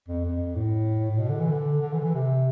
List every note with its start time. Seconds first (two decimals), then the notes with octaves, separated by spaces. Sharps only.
0.08 F2
0.24 F2
0.56 A2
1.10 A2
1.19 B2
1.29 D3
1.40 E3
1.51 D3
1.82 D3
1.93 E3
1.99 D3
2.03 E3
2.14 C3